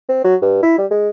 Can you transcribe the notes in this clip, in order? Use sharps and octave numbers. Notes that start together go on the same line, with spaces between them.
C4
F#3
G2
E4
G3
G#3